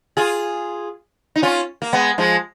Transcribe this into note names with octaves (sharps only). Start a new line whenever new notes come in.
F4 G#4
D#4
C#4 F4
A#3
G#3 B3
F3 G#3